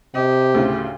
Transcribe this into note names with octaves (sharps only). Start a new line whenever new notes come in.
C3 G4 D#5
D2 A2 C#3